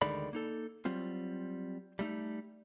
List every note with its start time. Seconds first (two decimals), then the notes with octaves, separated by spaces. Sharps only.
0.02 D2 D3 D#3 G#3 D5 B5
0.33 A#3 D#4 A4
0.85 F#3 G3 C4 F4
1.99 G3 A3 D#4